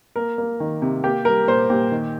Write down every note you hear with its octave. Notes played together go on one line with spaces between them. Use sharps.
A#3 A#4
A#3
D#3
C3
A#3 G4
G3 A#4
A#2 C5
A#2 G4
D#3